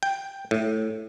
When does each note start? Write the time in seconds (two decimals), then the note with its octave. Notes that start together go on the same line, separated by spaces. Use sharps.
0.03 G5
0.51 A2